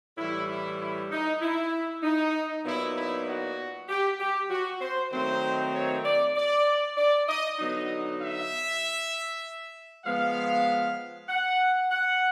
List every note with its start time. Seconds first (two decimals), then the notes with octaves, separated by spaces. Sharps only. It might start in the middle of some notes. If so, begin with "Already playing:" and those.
0.18 A2 E3 G3 E4
0.49 E4
0.80 E4
1.11 D#4
1.42 E4
2.03 D#4
2.65 A#2 F#3 B3 D#4 E4
2.96 E4
3.27 F#4
3.88 G4
4.19 G4
4.50 F#4
4.80 C5
5.12 D#3 F#3 A3 C4 D#4 C5
5.74 C#5
6.04 D5
6.35 D5
6.97 D5
7.27 D#5
7.59 D3 F#3 B3 D#4 D#5
8.20 E5
10.05 F3 G#3 B3 F5
11.29 F#5
11.91 F#5